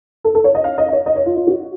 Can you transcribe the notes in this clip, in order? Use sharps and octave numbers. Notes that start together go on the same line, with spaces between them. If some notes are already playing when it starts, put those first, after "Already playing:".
A4
A4
C#5
D#5
F5
D#5
D#5
C#5
D#5
C#5
F4
F4
F#4